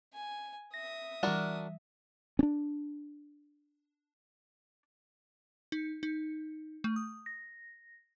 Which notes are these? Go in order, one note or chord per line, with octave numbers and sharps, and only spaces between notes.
G#5
E5 D#6 A#6
E3 G3 D4 F#4 A#4
C#4 D4
D#4
D#4
A3
D#6
A#6